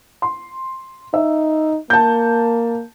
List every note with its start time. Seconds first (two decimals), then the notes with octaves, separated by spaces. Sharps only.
0.22 C6
1.14 D#4 E5
1.90 A#3 A5 G6